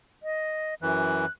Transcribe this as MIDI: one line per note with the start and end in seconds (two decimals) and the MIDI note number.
0.23 0.74 75
0.82 1.26 42
0.82 1.26 52
0.82 1.31 90